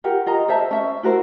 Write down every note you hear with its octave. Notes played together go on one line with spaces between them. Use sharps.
F4 G4 A#4 F#5
F4 D#5 A#5
A4 C5 E5 A5
C#4 E5
E4 F#4 A#4 C5